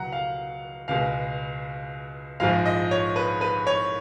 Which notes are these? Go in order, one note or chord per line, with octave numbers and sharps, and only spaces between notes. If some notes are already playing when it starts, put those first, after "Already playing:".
Already playing: C#2 B2 F#3 F#5 A#5
F5
C#2 B2 G#3 F5
A#1 G#2 F3 G#3 F5
D#5
C#5
B4
B4
C#5